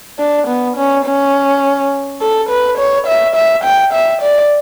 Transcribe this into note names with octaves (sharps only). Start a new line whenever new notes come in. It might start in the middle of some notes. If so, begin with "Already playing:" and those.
D4
B3
C#4
C#4
A4
B4
C#5
E5
E5
G5
E5
D5